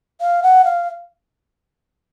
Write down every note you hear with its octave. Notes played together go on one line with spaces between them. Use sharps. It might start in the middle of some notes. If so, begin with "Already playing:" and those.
F5
F#5
F5